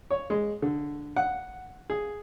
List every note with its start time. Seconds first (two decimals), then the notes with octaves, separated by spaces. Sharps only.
0.11 C#5
0.30 G#3
0.62 D3
1.16 F#5
1.90 G#4